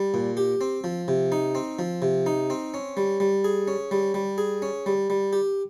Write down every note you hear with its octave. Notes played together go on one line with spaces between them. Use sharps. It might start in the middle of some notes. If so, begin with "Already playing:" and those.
Already playing: G3
A#2
G4
C4
F3
C3
D#4
C4
F3
C3
D#4
C4
C#4
G3
G3
G#4
C#4
G3
G3
G#4
C#4
G3
G3
G4